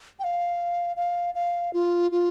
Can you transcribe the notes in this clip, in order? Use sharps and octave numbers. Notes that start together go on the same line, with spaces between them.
G5
F5
F5
F5
F4
F4